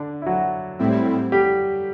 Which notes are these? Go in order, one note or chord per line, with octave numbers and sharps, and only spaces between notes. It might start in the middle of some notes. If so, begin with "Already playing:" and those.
Already playing: D3 D4
E4
F#3 F#4
A2 G3 C4 E4
G3 G4